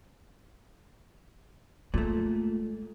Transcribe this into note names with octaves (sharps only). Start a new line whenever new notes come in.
A#2 G#3 A3